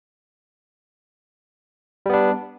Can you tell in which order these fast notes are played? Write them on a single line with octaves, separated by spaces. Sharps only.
G3 B3 D4